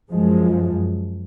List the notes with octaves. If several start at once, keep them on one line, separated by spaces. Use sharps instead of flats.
F#2 F3 G#3